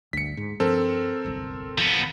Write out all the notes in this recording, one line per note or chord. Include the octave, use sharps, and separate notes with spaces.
G1 D2 B6 C#7
G#2
G2 F3 C4 A4 A#4
D1 G1 C2
F3 B3